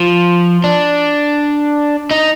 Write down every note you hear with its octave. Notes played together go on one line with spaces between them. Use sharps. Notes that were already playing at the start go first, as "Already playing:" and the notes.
Already playing: F3
D4
D#4